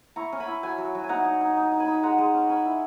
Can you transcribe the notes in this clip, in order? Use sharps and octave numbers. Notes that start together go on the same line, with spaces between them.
E4 A#5 C#6
C#4
G#5 B5
E4
F#3 G#5 B5
F#3
F#3
G#5
D#4 F#5 A#5
D#4
D#4
D#4
D#4
G#5 B5
D#4
G#3 F#5 A#5
G#3
C#4
C#4 G#5 B5
E4